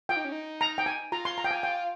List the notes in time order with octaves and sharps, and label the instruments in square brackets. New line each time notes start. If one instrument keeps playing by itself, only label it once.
[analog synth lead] F4 [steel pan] G5
[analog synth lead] D#4
C#4
D#4
[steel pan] A#5
G5
G#5
[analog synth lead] F4 [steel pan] A#5
[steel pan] C6
A#5
G5
G#5
G5